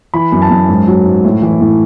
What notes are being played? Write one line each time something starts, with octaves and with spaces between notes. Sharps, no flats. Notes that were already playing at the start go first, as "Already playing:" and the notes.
E3 B5
F#2
A5
F#2
G#2
F#3
G#2
A2
E3
A2